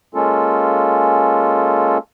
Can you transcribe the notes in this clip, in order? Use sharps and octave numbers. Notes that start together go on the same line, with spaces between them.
G#3 A#3 C#4 F4 A4